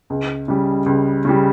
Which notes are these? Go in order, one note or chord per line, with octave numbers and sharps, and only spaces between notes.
C#2
C#3 G3
C#2
C#3 G3